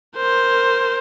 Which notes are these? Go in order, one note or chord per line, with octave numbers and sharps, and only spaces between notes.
A#4 C5